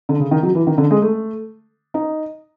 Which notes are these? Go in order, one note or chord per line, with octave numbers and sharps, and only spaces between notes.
D3
C#3
D#3
F#3
E3
D#3
D3
G#3
A3
D#4